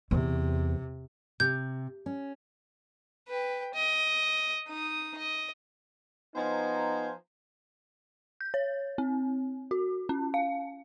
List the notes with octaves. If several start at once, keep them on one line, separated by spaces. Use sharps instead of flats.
E2 C3
C3 G6
C#4
B4 G5
D#5
D#4 D#6
D#5
F3 B3 D#4 C5 G#5 A#5
G6
C#5
C4
F#4
C#4
F5